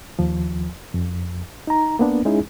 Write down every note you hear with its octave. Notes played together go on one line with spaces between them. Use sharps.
D#2 F3
F2
D#4 A#5
A#3 B3 D4
G#3 C#4 D#4 E4 G#4